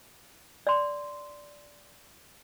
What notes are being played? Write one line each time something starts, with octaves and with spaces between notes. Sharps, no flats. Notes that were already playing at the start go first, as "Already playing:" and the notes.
D5 C6